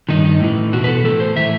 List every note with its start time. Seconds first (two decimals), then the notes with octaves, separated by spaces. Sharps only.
0.09 G2 D#3 D#4
0.25 D#4
0.40 A2 E3
0.73 E2 B2 F#4
0.84 B4
0.88 A4
1.04 A2 E3 A4
1.20 C5
1.36 A2 E3 E5